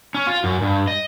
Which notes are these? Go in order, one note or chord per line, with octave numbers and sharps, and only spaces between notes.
C#4
F4
F#2
G2
D#5